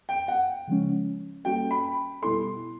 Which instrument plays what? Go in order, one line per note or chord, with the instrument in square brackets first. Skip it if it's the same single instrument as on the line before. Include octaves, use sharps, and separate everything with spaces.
[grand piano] G5
F#5
[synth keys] C#3 F3 G#3 C#4
[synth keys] G3 A#3 C#4 F#4 A4 [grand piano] G5
[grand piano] B5
[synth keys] B2 G3 B3 E4 A4 [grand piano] C6